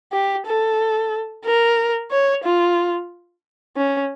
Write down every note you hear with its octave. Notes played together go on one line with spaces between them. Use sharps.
G4
A4
A#4
C#5
F4
C#4